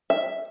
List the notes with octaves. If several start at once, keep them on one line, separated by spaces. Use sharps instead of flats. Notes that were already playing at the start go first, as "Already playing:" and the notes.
E5